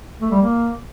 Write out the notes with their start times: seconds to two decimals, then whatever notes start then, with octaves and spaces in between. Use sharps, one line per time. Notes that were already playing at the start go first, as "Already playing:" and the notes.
0.21 A3
0.31 G3
0.41 A#3